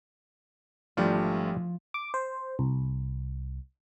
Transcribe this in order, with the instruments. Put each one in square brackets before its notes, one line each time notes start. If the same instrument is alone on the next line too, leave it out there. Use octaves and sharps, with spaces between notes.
[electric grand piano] G#1 A3 D4 [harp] F3 [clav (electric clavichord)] G3 F4
[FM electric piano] D6
C5
C2